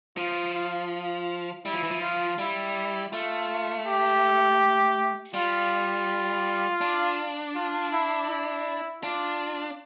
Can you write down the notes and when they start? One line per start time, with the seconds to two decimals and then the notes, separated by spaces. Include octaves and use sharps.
0.17 F3 F4
0.54 F4
0.91 F4
1.65 G3 E4
1.74 F3
1.83 E3
1.91 F3
2.01 F4
2.39 G3 E4
3.12 A3 F4
3.86 G4
5.34 G3 F4
6.81 D4
7.55 F4
7.92 E4
8.29 E4
9.02 D4 F4